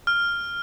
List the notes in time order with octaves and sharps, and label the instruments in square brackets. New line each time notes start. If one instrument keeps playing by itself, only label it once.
[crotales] F6